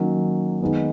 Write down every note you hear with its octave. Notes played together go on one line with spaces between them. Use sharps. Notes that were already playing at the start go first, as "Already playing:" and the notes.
Already playing: D#3 F#3 A#3 C#4
D#3 G#3 B3 D#4